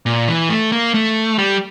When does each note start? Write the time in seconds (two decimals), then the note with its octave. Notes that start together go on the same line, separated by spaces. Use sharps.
0.06 A#2
0.28 E3
0.49 A3
0.72 A#3
0.94 A3
1.39 G3